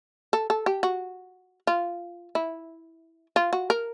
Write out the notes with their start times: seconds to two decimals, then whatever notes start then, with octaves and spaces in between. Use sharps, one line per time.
0.33 A4
0.50 A4
0.66 G4
0.83 F#4
1.67 F4
2.35 E4
3.36 F4
3.53 F#4
3.70 A#4